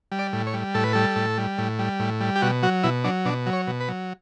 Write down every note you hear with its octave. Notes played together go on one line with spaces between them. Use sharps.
G3
D5
A2
C#5
G3
A2 A4
B4
G3 A4
A2
G3
A2
G3
A2
G3
G4
B2 F#4
F#3 F#4
B2 E4
F#3 D4
B2 D4
F#3
C#5
B2
B4
F#3